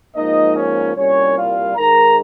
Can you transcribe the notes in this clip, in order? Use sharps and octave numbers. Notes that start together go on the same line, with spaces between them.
G#2 F3 A#3 D#4 D#5
C#4 C#5
C2 A#2 G3 C#4 C#5
F4 F5
G#2 D#3 G#3 A#4 A#5